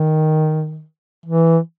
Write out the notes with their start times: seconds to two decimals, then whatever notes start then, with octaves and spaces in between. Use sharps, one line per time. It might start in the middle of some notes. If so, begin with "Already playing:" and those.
Already playing: D#3
1.26 E3